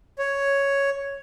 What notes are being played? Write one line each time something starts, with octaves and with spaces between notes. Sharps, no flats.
C#5